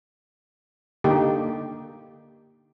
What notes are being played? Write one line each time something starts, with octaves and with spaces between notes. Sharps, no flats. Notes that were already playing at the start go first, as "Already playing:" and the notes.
D3 A#3 D#4 G4